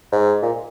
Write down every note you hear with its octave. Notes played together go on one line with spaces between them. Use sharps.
G#2
A#2